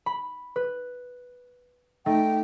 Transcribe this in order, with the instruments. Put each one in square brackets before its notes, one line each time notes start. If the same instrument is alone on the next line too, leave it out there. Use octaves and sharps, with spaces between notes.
[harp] B5
B4
[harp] A3 D#4 [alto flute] G5